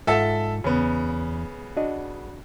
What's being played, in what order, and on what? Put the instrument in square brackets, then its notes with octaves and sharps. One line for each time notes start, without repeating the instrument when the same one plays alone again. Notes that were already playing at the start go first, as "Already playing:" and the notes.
[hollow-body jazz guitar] G#2 F4 F#5 [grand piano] A4 E5 A5
[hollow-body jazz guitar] E2 [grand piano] C#3 B3
[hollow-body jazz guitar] D4 F#4 D#5